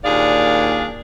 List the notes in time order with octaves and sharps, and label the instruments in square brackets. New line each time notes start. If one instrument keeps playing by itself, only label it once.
[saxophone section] D#2 A#2 D4 G#4 D5 F5